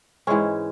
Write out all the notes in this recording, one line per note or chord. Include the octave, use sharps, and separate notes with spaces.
G#2 E3 G#3 C#4